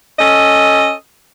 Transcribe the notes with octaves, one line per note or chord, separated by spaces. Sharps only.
C#4 A4 D#5